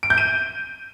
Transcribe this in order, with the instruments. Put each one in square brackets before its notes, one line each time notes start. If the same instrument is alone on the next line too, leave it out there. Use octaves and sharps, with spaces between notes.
[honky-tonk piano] D7
G6
D#7